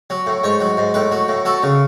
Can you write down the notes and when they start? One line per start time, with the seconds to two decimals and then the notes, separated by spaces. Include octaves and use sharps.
0.10 F#3
0.27 A2
0.44 G#2 C#5
0.60 F#3
0.77 G#2
0.94 A2 B4
1.12 F#3
1.29 A2
1.45 F#3 A4
1.63 C#3